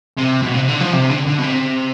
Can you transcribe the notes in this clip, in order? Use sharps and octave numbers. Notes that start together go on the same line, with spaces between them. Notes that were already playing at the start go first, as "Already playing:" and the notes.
C3
B2
C3
D3
F3
C3
D3
D3
B2
C3